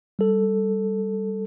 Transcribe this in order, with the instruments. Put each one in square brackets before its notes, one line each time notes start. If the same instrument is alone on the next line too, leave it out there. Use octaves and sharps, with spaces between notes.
[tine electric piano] G3 A4